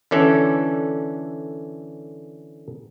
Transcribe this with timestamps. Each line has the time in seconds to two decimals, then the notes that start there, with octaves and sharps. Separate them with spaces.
0.11 D3 E3 C#4 A4 D5